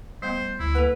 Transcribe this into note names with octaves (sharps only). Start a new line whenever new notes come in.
G3 A3 B3 C5
D2 E4
A#3 A4 B4